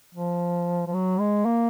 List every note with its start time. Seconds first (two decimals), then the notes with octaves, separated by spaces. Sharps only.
0.15 F3
0.87 F3
0.94 F#3
1.20 G#3
1.46 A#3